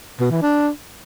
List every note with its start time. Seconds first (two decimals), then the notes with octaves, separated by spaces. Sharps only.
0.20 B2
0.31 E3
0.42 D4